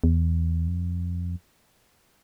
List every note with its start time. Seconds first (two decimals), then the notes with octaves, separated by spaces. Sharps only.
0.04 E2
0.68 F2